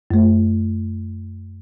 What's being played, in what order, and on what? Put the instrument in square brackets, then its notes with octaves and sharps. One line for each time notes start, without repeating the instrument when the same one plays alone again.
[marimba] F#2 A3